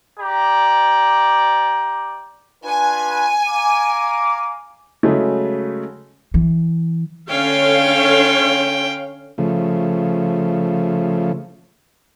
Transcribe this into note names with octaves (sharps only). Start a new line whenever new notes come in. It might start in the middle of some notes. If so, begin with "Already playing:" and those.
G4 D5 A#5
D4 F4 B4 G#5
F5 A#5 D6
C#3 F#3 G#3 A3
E3
D3 C#4 C#5 F5 G5
C#3 F3 A3